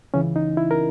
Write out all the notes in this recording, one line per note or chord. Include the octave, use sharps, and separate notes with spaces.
C#2 C#3 E3 C#4
D#4
E4
A#4